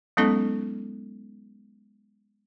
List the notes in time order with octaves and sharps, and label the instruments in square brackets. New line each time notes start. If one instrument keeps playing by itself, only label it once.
[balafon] F#3 G#3 B3 C#4 D#4 A4